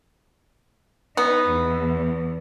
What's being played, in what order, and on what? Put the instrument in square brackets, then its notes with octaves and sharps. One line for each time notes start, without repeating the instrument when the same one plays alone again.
[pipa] B3 [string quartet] D#4
[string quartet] E2